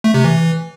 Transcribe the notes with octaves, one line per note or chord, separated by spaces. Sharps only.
A3
C3
E3